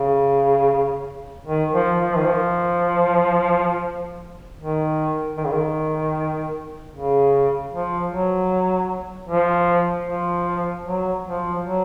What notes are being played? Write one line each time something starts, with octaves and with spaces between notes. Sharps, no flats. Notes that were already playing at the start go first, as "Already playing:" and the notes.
Already playing: C#3
D#3
F3
F3
D#3
F3
D#3
D#3
C#3
D#3
C#3
F3
F#3
F3
F3
F#3
F3
F#3